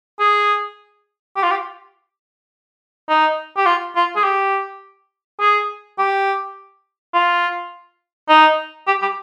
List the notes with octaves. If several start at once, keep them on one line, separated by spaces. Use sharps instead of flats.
G#4
G4
F4
G4
D#4
G4
F4
F4
G#4
G4
G#4
G4
F4
D#4
G4
G4